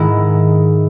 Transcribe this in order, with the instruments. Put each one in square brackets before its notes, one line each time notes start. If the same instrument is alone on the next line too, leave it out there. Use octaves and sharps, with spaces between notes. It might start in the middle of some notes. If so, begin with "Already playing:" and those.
Already playing: [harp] G#2 D#3 G#3 E4